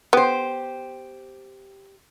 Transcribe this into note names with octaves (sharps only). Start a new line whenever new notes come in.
B3 G4 C5